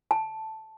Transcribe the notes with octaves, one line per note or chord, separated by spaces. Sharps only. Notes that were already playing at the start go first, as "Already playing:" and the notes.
A5